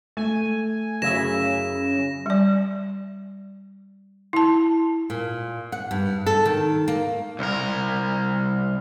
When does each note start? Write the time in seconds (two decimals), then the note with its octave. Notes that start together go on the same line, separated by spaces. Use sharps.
0.17 A3 G#5
1.02 F#2 C#3 E4 E5 A#6 E7
2.26 G3 D5
4.33 E4 A5
5.10 A#2
5.72 F#5
5.91 G2
6.26 A4
6.45 D#3
6.88 A#3
7.39 C2 A#4